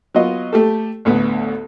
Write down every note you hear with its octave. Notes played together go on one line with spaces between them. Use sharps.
F#3 B3 F4 D#5
A3 G4 A4
A1 D2 B3